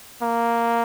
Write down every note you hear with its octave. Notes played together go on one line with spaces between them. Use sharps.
A#3